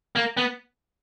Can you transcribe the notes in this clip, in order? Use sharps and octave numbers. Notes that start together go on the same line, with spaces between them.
A#3
B3